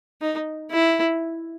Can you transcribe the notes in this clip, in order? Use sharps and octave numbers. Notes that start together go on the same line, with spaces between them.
D#4
E4